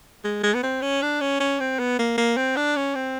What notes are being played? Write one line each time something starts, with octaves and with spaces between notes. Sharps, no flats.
G#3
G#3
B3
C4
C#4
D4
C#4
C#4
C4
B3
A#3
A#3
C4
D4
C#4
C4